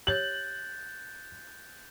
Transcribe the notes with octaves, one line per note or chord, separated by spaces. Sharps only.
G4 C#5 F#6 G6 A6 F#7